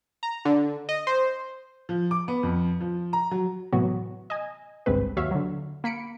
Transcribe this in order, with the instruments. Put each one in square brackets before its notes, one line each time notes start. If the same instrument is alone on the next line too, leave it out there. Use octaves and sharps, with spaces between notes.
[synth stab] A#5
D3
D#5
C5
[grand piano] F3
D6
B3
F2
F3
A#5
F#3
[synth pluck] A2 C3 E3 F#3 B3 F#4
D#5 G#5
G#1 C#2 G2 G#3 C4 B4
D#2 F#3 C#5 E5 F5
D3 F#3
A#3 B5 C#7 D7